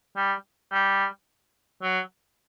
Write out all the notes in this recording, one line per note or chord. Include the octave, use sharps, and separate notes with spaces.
G3
G3
F#3